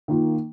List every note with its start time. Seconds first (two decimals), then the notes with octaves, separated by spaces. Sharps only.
0.08 D#3 A#3 F4